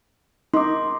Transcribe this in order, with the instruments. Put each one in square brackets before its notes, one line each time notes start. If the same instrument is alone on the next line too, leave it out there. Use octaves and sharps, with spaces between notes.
[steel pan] D#4 [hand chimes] C6 D6